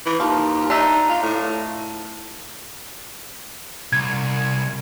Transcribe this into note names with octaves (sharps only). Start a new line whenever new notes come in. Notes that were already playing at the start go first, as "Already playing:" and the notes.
E3
D#2 F3
D4 D#4 E5
F4
A2
C2 G#6